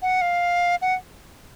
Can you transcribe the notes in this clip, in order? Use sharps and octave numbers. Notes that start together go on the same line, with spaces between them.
F#5
F5
F#5